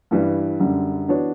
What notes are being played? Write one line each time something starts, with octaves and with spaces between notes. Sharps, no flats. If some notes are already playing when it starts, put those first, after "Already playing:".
G2 E3 G3
F#2 D3 G3
E3 B3 D4 F#4 C#5